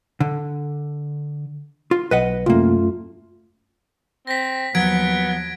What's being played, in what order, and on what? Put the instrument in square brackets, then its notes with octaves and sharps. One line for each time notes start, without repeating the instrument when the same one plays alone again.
[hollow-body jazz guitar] D3
F4
[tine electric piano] B1 [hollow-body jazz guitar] B4 D#5 F#5
[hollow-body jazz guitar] C2 A#3 [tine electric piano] F#2 A3 F4
[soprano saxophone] C4 [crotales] A#6 B6
[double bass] D#2 F3 [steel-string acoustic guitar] F#3 [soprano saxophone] B3 [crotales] G#6 B6 D7